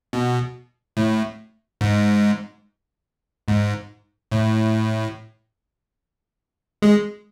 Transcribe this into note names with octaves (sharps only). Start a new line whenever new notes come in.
B2
A2
G#2
G#2
A2
G#3